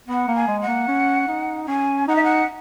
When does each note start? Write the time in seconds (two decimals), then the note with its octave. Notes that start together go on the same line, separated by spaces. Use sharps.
0.08 B3 F#5
0.28 A#3
0.35 G#5
0.48 G#3
0.61 F#5
0.68 A#3
0.88 C#4
1.28 D#4
1.68 C#4 G#5
2.08 D#4 F#5
2.15 E5
2.23 F#5